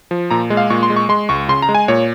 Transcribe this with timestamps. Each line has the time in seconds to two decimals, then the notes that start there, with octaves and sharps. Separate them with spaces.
0.11 F3
0.31 A#2 A#5
0.50 G#3
0.57 F5
0.70 A#2 C#6
0.83 C6
0.90 G#3
0.96 C#6
1.09 G#3 C6
1.29 C#2 C#6
1.49 C#3 C6
1.62 A#5
1.69 G#3
1.75 G#5
1.88 A#2 C#5